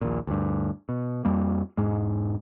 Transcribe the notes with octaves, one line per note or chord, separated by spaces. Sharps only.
A#1 D#2 A#2
D2 G2
B2
F2 G3 A#3
E1 G#2 G#3